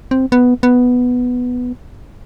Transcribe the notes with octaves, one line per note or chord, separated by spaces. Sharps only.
C4
B3
B3